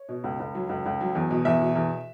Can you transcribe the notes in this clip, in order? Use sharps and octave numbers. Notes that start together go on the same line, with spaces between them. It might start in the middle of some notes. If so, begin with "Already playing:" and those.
Already playing: C#5
B2
C#2
C#2
F#3
C#2
C#2
F#3
E2
B2
E2 E5
B2
E2